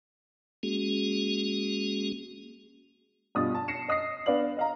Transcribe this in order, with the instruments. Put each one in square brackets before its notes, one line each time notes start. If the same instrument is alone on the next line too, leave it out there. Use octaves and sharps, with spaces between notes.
[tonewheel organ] G#3 A#3 C#4 F#4 G#4
[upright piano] G2 B2 F4 D#6 A6
A5
A#6 C7 C#7 E7
D#5 D#6 A#6 C7
B3 D4 B4 D5 F5 F#7
D#5 F5 A#5